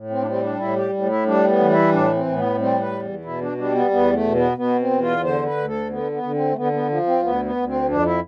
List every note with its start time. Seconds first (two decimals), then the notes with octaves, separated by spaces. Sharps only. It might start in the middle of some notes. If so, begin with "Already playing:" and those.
Already playing: A2
0.10 C4
0.22 D4
0.26 G3 C4
0.43 D4
0.59 A2 E4
0.76 G4
0.93 A2
1.09 E4
1.26 G3 D4
1.48 B3
1.59 E3
1.70 E4
1.92 A2 D4
2.14 C4
2.25 A2
2.36 B3
2.58 G3 C4
2.81 B4
2.92 E2
3.25 B2 E4
3.41 D4
3.58 G3 D4
3.74 B3
3.91 E2 B3
4.13 A3
4.24 B2
4.35 B3
4.57 B2 B3
4.79 C4
4.90 E2
5.02 F4
5.24 D3 C5
5.46 B4
5.57 D2
5.68 A4
5.90 D3 B3
6.12 B3
6.23 D3
6.34 C4
6.52 A3
6.56 D3 B3
6.73 B3
6.89 F3
7.06 C4
7.22 D2 B3
7.45 B3
7.55 D2
7.67 C4
7.89 F2 D4
8.05 E4